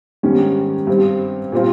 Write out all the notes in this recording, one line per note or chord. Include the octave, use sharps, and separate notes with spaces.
G#2 D#3 G3 C#4
G2 G3 C4
A#2 G3 C4 F4